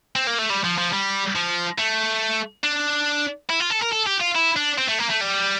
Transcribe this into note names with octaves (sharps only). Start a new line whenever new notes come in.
C4
A#3
A3
G3
F3
F3
G3
F3
A3
D4
E4
F4
A4
A#4
A4
G4
F4
E4
D4
C4
A3
A#3
A3
G3